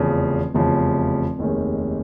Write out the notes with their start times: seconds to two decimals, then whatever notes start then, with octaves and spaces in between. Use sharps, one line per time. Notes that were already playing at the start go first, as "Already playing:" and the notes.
Already playing: F1 E2 C#3 F3
0.54 F1 E2 C#3 F3
1.39 F1 D#2 D#3 G#3 C#4